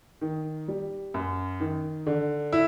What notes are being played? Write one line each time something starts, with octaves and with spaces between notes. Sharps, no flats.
D#3
G3
F#2
D#3
D3
E4